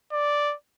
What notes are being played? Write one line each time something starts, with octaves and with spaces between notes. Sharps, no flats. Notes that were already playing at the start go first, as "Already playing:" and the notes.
D5